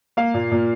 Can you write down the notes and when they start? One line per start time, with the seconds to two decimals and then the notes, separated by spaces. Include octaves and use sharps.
0.17 A#3 F5
0.34 A#2
0.52 A#2